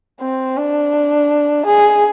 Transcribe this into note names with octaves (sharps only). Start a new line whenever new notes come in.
C4
D4
G#4